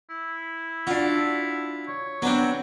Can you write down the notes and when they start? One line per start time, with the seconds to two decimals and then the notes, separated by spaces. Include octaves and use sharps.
0.10 E4
0.87 D4 F4 F#4
1.88 C#5
2.22 F#3 B3 C4 D4